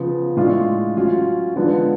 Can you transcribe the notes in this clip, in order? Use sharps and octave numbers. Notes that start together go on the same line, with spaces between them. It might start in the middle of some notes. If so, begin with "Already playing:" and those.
Already playing: C#3 F3 B3
A2 G#3 D4 F4
F#3 C#4 F4
D3 F3 G#3 B3 F4